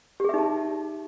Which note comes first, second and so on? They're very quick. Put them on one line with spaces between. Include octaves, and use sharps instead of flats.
G4 G#4 E5 D#4 A5